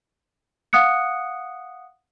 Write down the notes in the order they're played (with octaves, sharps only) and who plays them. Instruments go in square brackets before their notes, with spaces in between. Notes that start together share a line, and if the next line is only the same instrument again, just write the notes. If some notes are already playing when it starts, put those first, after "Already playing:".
[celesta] F5 F#5 D#6 F#6 C#7